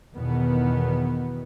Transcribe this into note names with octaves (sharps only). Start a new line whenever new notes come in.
E2 B2 D#3 B3